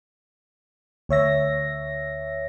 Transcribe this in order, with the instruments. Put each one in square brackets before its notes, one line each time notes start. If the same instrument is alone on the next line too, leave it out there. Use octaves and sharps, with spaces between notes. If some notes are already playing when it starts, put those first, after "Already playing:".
[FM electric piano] D2 C#5 E5 A#6